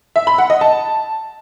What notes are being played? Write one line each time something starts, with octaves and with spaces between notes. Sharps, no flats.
E5
B5
F#5
D#5
A5